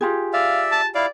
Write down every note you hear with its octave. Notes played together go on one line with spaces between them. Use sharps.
F4 G4 G#4
D5 E5 F5
A5
E4 D5 F5